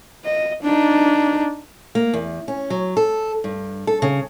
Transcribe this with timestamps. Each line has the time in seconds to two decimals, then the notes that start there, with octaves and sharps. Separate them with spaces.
0.25 D#5
0.63 D4 D#4
1.95 A#3
2.14 E2
2.48 C#4
2.70 F#3
2.97 A4
3.44 G2
3.87 A4
4.02 C#3